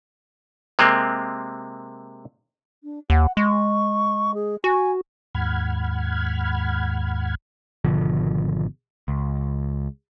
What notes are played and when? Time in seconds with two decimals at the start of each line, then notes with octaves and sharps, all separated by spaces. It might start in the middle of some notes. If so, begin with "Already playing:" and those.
0.79 C3 G#3 A#3 C4
2.84 D4
3.10 D#2 F#5
3.37 G#3 C#6
4.34 G#4
4.64 F#4 G#5
5.35 D#2 G#2 F#5 B5 F6 G#6
7.85 G#1 B2 D3 F3
9.08 C#2